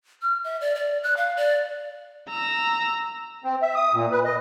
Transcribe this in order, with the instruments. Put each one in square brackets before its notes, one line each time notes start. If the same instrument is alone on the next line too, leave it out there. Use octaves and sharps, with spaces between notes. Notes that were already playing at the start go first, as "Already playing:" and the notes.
[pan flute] F6
E5
D5
D5
F#6
F5
D5
[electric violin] A#5 E6
[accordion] C4
E5
D#6
A#2
B4
D#5